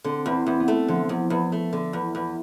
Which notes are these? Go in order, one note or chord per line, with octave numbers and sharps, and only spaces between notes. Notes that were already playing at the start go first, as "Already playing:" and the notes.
D3 C4
E2
C4
E2
B3
A3
D3 F3
E2
E2
A3
D3
E2
E2